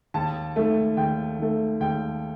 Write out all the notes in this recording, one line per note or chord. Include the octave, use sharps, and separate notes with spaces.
D#2 A5
D#3 A3
D#2 G5
D#3 A3
D#2 G5